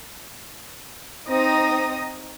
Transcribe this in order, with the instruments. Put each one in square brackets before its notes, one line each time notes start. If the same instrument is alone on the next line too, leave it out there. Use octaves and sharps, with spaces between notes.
[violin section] C4 D#4 D#6 A#6